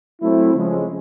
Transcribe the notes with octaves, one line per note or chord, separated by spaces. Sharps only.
F#3 A3 C4 E4
C#3 F3 G#3 C#4